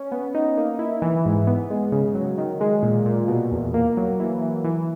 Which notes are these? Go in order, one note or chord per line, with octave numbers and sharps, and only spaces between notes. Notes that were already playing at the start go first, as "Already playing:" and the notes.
Already playing: C#4
B3
D#4
A#3
E4
E3
G#2
B3
G#3
C#3
F#3
D#3
G#3
A#2
A#2
B2
E2
A#3
F#3
E3
E3
E3